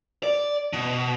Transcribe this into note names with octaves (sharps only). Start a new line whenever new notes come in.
D5
B2